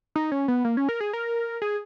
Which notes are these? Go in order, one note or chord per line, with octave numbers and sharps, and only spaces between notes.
D#4
C#4
B3
A#3
C#4
A#4
G#4
A#4
G#4